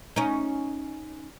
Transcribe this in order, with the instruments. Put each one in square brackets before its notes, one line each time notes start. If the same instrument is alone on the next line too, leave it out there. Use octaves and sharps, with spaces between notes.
[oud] C#4 D#4